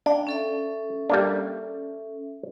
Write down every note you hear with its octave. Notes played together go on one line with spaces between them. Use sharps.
D4 D5 F5 G5
C#4 A4 E5
G3 A#3 D4